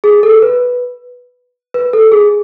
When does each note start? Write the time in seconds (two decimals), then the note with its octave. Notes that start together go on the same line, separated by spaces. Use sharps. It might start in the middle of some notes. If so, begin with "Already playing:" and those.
0.04 G#4
0.23 A4
0.42 B4
1.74 B4
1.93 A4
2.12 G#4